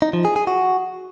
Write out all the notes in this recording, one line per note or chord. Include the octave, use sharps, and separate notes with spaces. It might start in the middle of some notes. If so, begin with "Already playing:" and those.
D#4
F3
G#4
G#4
F#4